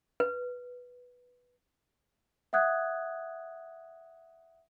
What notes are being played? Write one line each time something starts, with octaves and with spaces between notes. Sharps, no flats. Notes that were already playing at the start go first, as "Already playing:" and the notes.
B4
E5 F#5 D#6 F#6 G#6